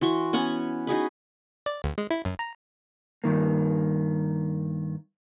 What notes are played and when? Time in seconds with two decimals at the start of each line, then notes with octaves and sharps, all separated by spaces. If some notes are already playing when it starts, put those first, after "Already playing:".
0.01 E3 F#4 C6 C#6
0.33 B3 C#4 F#5 G#5
0.87 D#4 F#4 G#4 B4
1.66 D5
1.84 D2
1.98 G#3
2.10 E4
2.25 F#2
2.39 A#5
3.24 G2 D#3 A#3